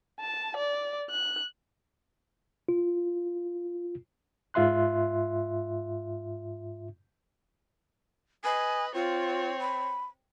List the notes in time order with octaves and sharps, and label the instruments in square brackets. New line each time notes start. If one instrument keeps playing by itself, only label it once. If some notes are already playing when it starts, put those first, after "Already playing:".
[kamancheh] A5
D5
F#6
[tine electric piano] F4
[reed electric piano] G#2 F4 E5 C6 F#6
[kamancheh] B4 D#5 [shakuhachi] G#5
[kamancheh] C4 C#5 [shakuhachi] F4
[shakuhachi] B5